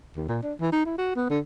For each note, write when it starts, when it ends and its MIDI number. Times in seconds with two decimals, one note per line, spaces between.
0.16 0.26 39
0.28 0.40 46
0.43 0.54 62
0.60 0.72 52
0.72 0.84 63
0.86 0.97 64
0.98 1.12 66
1.16 1.25 59
1.30 1.39 50